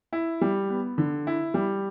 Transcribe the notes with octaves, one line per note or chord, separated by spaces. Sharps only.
E4
G3
B3
D3
E4
G3